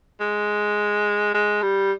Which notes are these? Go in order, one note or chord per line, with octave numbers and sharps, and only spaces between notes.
G#3
G#3
G3